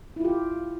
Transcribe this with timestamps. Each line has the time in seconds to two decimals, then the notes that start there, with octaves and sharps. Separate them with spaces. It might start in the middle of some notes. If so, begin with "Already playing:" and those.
0.16 E4
0.20 F4
0.25 G4